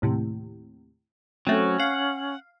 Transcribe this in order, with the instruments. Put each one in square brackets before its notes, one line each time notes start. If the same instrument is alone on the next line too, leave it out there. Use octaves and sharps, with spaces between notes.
[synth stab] D#2 A2 C3
[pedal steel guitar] F#3 F#4 [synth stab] A3 C4 [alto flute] C#4
[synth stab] F5 [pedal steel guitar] F#5